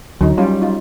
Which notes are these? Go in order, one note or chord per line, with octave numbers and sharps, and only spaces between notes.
D2 D3 F#3 D#4
F#3 G3 C#4 F4
D#4 F4